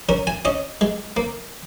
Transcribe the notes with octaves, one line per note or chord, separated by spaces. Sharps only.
C#4 A#4
G#5
C#4 D#5
G#3
A#3